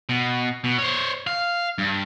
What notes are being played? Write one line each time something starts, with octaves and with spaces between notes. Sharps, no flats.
B2
B2
C5 C#5
F5
G2